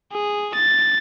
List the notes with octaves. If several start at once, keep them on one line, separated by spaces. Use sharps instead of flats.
G#4
A6